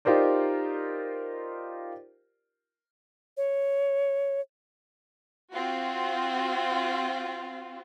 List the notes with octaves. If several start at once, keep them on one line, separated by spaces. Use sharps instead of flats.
D#4 F4 G4 A#4 C5 D5
C#5
C4 F4 F#4